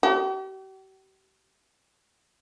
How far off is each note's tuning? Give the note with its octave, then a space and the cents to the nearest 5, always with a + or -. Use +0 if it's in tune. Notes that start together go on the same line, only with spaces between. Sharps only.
G4 -40